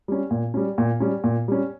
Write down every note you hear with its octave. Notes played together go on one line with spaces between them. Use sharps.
G3 C#4
A#2
G3 C#4
A#2
G3 C#4
A#2
G3 C#4